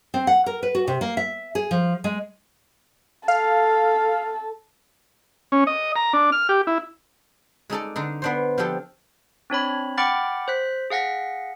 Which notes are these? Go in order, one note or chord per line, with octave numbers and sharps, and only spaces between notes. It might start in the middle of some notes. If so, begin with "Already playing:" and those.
C4
F#5
A#4
B4
F#4
C3
A#3
E5
G#4
F3
G#3
A4 F5
C#4
D#5
A#5
D4
F6
G4
E4
G#3 D#4 A4 D5
D3 D4 D#4
B3 D4 C5
F3 D4 G4 A4
C4 D4 C#5 B5
F#5 G5 B5 D6 F6 A6
C5 F#6 B6
G#4 F5 F#5 A#6 B6